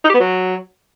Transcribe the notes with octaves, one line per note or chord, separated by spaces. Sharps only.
D#4
G4
B3
F#3